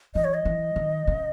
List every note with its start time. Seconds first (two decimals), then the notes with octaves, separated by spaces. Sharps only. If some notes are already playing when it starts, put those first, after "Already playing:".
0.15 E3 D#5
0.24 C#5
0.34 D#5
0.45 E3
0.76 D#3
1.07 C#3